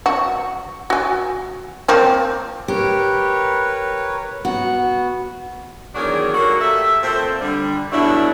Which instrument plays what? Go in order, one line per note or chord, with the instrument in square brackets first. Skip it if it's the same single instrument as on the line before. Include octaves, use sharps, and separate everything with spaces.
[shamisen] F#4
F#4 G#5
F3 A#3 C4
[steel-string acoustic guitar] G4 [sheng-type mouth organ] A#4 B4 C#5
[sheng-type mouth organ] B3 [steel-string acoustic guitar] F#4
[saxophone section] E2 D#3 F#3 D4 G#4 A#4
F#3 A#3 F#4 A4 A#4
A3 G4 A4 E5
A#2 A3 C4 C5
D3 G3
G2 B2 F#3 A3 D4 E4